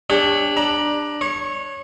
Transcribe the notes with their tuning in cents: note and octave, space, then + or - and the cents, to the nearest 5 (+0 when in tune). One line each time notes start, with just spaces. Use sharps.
D4 +0 G4 +40 C#5 +0
D4 +15 A#5 +25
C#5 +0 C#6 -30